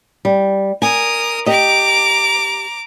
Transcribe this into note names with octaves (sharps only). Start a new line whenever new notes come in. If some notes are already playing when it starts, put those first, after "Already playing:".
G3
A#4 G#5 D#6
G4 D#5 A#5 D6